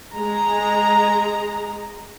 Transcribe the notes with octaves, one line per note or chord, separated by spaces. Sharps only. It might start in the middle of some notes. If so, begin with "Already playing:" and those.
G#3 A#5